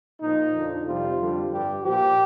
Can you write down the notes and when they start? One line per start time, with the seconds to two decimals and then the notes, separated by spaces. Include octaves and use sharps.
0.22 A#2 F3 D#4
0.54 F2 D3 F3
0.86 F2 C3 G3 F4
1.19 F2 D3 G3
1.51 G2 D3 G3 G4
1.83 A#2 F3 G4